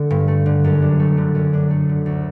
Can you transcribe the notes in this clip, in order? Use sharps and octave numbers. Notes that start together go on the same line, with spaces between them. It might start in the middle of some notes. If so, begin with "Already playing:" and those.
Already playing: D3 A3
G2
A3
D3
F#2
D4
A3
D3
F#2
D4
A3
D3
D2